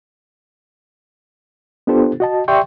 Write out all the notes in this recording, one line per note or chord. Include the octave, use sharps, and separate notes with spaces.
B3 D4 F4 G4 A4 C5
F#4 D#5 A5
G4 D5 E5 G5 C6 C#6